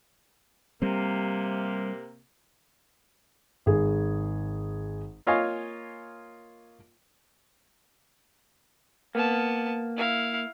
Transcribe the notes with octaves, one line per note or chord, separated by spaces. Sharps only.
C3 G3 A#3 C4
G#1 G#4
A#3 F4 C#5 D#5 F5 G#5
A#3 B3 A5
E4 F5